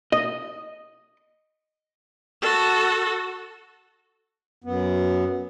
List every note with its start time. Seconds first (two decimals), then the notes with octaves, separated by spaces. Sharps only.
0.12 D#5
2.42 F#4 A4
4.64 F#2 B3